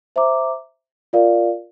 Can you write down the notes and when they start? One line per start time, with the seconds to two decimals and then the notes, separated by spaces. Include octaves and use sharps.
0.16 C5 E5 A#5 D6
1.13 F4 A#4 D5 F5